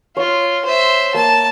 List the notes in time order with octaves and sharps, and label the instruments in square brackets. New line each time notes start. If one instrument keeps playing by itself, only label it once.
[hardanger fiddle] F4 [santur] C#5
[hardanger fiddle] C5 E5
[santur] A#3 [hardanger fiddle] A5